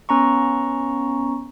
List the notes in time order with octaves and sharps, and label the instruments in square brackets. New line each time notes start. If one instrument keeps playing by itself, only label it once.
[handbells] B3 C#4 A#5 C#6